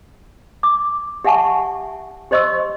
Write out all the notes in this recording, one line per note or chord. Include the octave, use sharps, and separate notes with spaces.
D6
G4 E5 F#5 G#5 A5 C#6
G4 C5 D#5 C6 C#6 E6